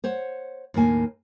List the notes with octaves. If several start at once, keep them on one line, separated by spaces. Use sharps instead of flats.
C5 C#5 F#5
D#2 A2 A#3 G#5